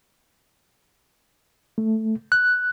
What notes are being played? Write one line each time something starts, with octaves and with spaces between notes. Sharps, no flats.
A3
F#6